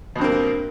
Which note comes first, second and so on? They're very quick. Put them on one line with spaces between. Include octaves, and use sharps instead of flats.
B2 G2 C4 A#3